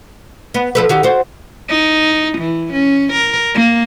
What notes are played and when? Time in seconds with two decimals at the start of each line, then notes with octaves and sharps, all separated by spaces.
0.54 B3
0.75 F3 A4 B4
0.89 D#3 F#4 G4
1.03 F#4 C5
1.69 D#4
2.38 E3
2.73 C#4
3.13 A#4
3.55 A#3